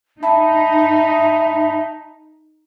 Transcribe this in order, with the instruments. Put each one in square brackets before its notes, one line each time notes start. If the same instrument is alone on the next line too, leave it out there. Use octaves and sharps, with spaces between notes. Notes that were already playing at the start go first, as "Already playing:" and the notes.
[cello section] D#4 [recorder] E5 [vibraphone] A5 B5